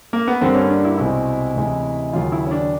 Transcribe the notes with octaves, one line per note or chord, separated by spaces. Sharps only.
A#3
B3
G2 D3 G3 A#3 C4
C#4
D4
E4
C2 B2 G#3 C4 E4
D2 C3 E3 G#3 C#4
D#2 C#3 F#3 F4
E4
C#4
D4